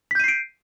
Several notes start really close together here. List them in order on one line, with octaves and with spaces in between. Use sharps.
B6 G6 D#7 C7 D7